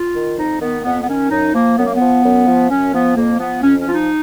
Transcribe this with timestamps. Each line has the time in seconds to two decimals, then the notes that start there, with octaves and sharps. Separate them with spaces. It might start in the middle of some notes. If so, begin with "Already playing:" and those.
Already playing: F4
0.16 D#3
0.38 F2 D#4
0.61 D#3 B3
0.84 F2 B3
1.03 B3
1.08 D#3 C#4
1.31 F#2 D#4
1.54 F3 A#3
1.78 F#2 B3
1.86 A#3
1.95 B3
2.01 F3
2.25 F#2
2.47 F3
2.70 F#2 C#4
2.94 F3 B3
3.17 F2 A#3
3.40 F3 B3
3.63 F2 C#4
3.79 C#4
3.86 F3 F4
3.94 D#4